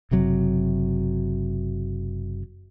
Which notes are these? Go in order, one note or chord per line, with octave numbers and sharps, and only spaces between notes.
F#1 C3 F#3